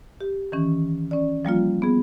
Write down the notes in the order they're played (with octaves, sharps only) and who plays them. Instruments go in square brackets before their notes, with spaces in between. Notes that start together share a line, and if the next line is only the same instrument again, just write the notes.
[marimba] G4
D#3 E3 C#4
C#4 D5
F3 G3 A#3 F4
B3 G#4